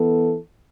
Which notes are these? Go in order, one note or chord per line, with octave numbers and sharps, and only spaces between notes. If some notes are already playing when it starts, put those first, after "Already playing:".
Already playing: E3 B3 A4